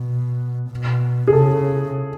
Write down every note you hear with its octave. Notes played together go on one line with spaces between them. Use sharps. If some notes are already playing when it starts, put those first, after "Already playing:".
Already playing: B2
B2
G#4
C#3 A4